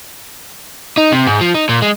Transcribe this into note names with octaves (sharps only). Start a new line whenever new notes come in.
D#4
C3
G#2
F3
D#4
A#2
G#3